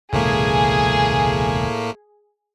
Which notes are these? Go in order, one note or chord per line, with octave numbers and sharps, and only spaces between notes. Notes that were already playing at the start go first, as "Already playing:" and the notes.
E1 C#2 A2 C3 A3 A#3 G#4